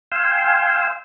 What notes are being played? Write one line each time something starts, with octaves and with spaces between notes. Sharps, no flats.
F5 G5 G#5 C6 E6